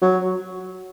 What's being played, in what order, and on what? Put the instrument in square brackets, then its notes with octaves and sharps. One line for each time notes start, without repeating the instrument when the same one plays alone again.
[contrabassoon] F#3